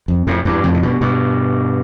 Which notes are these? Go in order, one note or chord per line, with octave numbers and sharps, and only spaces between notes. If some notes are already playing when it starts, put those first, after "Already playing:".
F2
F2 A2
E2 G2
F2 A2
C3
G2 B2
G2 B2